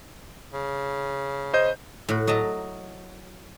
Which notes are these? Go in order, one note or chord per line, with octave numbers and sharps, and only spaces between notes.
C#3
C5 D#5 G6
A2 F#4
F#3 D#5 E5 A5 A#5